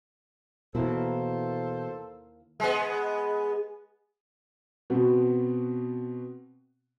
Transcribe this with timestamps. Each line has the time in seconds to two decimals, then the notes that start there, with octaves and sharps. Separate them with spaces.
0.75 D#2 B2 E3 A#3 E4 A4 C5
2.60 G#3 B3
4.90 B2 B3 C4 F#4